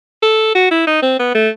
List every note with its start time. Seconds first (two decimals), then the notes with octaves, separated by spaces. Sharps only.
0.23 A4
0.55 F#4
0.71 E4
0.87 D#4
1.02 C4
1.19 B3
1.35 A3